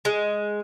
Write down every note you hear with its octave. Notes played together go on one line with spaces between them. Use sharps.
G#3